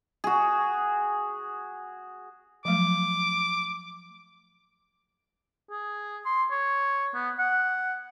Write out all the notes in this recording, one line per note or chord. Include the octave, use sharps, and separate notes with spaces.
F#4 G#4
F3 F#3 A3 D6
G#4
C6
C#5
B3
F#5